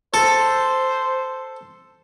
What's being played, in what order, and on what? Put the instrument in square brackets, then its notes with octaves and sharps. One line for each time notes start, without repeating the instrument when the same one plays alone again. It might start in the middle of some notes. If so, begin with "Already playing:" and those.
[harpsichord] A4 [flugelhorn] C5